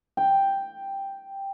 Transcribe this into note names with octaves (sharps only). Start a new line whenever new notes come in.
G5